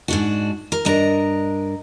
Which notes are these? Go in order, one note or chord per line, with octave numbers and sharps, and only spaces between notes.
G#2 D4 F#4
A#4
G2 D4 A#4 D#5 A#5